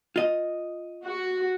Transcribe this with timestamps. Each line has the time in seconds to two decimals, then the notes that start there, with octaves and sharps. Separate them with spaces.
0.16 F4 D#5
1.03 F#4